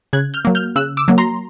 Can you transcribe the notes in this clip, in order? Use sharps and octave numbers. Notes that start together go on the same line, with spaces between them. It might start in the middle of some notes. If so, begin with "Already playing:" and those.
C#3 F#6 G#6
F6 G6
F#3 A#3
F6 G6
C#3 E6 F#6
D6 E6
F#3 A#3
A#5 C6